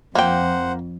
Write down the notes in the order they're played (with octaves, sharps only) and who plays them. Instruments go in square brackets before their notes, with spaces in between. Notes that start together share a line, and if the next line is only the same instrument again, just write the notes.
[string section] F2 [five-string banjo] A#3 G5 [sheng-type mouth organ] C5 F#5